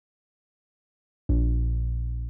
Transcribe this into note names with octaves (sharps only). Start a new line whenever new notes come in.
A#1